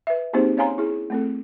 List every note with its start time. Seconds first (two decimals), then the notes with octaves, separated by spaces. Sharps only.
0.07 B4 E5
0.33 A#3 C4 D#4 G4 G#4 C5
0.57 C#4 C#5 F5 G#5 A#5 C6
0.78 E4 G#4
1.10 A3 C4 A4